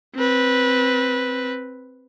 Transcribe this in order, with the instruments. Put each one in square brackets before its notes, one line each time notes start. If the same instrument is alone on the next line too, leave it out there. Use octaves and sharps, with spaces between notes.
[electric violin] C4 B4